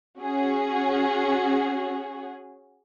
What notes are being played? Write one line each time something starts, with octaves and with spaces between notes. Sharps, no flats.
C#4 F#4 G#4